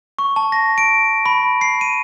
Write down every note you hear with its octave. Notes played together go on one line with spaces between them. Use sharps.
C#6
A5
A#6
D7
B5
C7
D#7